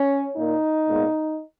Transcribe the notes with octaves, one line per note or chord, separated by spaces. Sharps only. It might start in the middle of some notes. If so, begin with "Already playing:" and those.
Already playing: C#4
A#2 A#3 D#4
A#2 G#3 B3